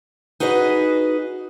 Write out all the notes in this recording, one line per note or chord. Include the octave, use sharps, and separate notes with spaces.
D#4 F#4 G#4 B4 D#5